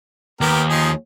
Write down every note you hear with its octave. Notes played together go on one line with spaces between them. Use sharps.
D#2 B3 G4 A#4
F3 D#4 G#4